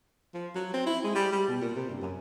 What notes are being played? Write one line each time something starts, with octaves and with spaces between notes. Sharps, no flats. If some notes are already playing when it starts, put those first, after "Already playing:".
F3
F#3
C4
E4
G#3
G3
G3
B2
A#2
C3
G2
F#2